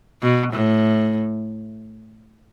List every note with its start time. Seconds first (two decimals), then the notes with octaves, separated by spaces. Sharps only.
0.22 B2
0.53 A2